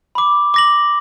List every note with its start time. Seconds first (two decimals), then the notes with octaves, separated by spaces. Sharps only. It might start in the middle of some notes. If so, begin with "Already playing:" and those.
0.15 B5 D6
0.54 D6 A#6 F#7